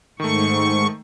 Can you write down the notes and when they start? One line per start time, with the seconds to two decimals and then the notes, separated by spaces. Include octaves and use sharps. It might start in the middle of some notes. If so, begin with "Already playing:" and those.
0.20 G#2 D#3 A3 C#6